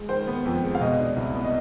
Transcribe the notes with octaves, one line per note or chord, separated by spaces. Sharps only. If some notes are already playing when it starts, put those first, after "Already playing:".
Already playing: G#3
D#3 C5
B3
F2
G#3
F5
B2 D#5
D4
C2
B3
D#5